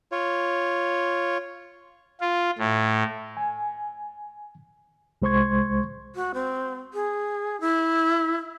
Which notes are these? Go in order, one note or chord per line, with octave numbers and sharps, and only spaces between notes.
F4 C#5
F4
A2
G#5
C2 G#3 C5 C6 C#6 G#6
F#4
C4
G#4
E4